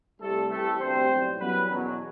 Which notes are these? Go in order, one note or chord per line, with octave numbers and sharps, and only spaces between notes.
C2 C3 G3 A3 A4
C2 C3 E3 G3 A3 A4
D2 C3 G3 C4 C5
B1 A2 G3
F#2 E3 G3 B3 B4
E2 B2 F#3